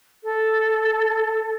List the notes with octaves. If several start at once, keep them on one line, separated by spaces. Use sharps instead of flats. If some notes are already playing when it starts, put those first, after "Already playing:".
A4